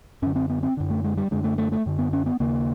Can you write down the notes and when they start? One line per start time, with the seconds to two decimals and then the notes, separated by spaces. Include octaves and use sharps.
0.22 F#2 D3 C#4
0.36 C4
0.49 B3
0.63 C4
0.77 F#2 D3
0.90 A3
1.04 G#3
1.17 G3
1.31 F#2 D3 G#3
1.44 A3
1.58 A3
1.72 A3
1.86 F#2 D3
1.99 B3
2.13 C#4
2.26 B3
2.40 D#2 C#3 A#3